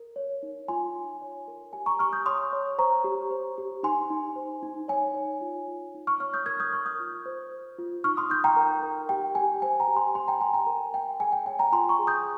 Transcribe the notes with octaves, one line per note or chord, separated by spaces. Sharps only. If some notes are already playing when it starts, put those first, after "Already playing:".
Already playing: A#4
C#5
D#4
F4 G#5 C6
F4
C#5
A#4
G4 G#5
A#5 C#6
G4 C#6 F6
D#6 G6
C#5 C6 D#6
C#5
C5 A#5 C#6
G4
C5
G4
D#4 G#5 C6
D#4
C5
D#4
C#5 G#5
C#5
F4
F4
D#4
C#6 F6
C#5 C#6 F6
D#6 G6
A#4 F6 G#6
D#6 G6
A#4 C#6 F6
D#6 G6
F4
C5
C5
F4
D#4 C#6 F6
C6 D#6
D#4 D#6 G6
G5 A#5
A#4
A#4
G4 G5
G4 G#5
C5 G#5
G5 A#5
G4
G#5 C6
G4 G#5 C6
G5 A#5
G4 G#5 C6
G5 A#5
A#4
A#4 G5
G#4 G#5
G5
C#5 G#5
G5 A#5
F4 G#5 C6
A#5 C#6
G#4
D#6 G6